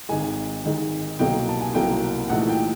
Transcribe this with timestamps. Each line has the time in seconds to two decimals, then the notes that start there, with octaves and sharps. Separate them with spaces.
0.09 G#1 G#2 D#3 G#3 G#5
0.65 G#1 G#2 D#3 G#3
1.19 C2 B2 F#3 A#3 G5
1.49 A5
1.61 G#5
1.74 C2 B2 F#3 A#3 G5
2.30 A#1 G#2 E3 A3 F#5
2.49 G5